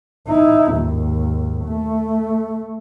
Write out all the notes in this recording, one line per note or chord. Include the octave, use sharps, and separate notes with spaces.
D#4 E4
D#2 G#2
A3